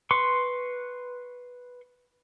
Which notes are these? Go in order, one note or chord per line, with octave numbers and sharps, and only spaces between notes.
B4 C6 C#6